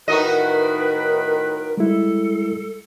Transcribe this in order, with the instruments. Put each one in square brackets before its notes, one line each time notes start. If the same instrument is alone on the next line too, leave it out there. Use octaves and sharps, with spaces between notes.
[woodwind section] A2 D#3 B4 [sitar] D#4 F#4 D#5 [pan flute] A#4
[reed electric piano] G3 G#3 E4 [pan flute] A4